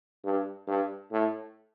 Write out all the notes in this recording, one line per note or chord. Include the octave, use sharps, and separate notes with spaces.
G2
G2
A2